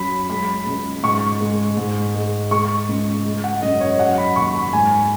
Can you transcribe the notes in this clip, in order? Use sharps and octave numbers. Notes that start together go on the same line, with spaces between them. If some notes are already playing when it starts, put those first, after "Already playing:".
Already playing: F#2 F#3 B5
G#3 B5
C#2
G#2 C#6
G#3
G#2
G#3
G#3 C#6
C#2
G#3
F#5
F#2 D#5
C#5
F#3 F#5
B5
D#2 C#6
B5
G#2 G#5